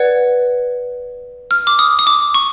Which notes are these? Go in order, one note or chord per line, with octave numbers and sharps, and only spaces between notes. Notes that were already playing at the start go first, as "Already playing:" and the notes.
Already playing: B4 D5 F#5 G#6
F6
D6
D#6
D#6
D6
C#6